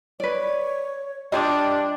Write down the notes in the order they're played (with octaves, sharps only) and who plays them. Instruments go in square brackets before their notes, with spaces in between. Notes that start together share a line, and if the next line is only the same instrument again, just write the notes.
[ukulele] B4 D5 [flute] C#5
[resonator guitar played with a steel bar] G3 F4 A5 [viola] D4 [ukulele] D#5 [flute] G5